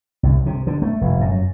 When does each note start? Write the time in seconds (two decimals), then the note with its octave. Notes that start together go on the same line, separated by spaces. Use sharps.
0.23 C2
0.46 C3
0.67 D3
0.82 A3
1.01 F1
1.21 F#2